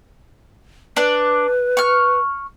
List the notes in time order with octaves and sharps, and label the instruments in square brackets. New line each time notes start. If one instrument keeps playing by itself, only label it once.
[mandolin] D4 D5 [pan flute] B4
[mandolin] C#6 F6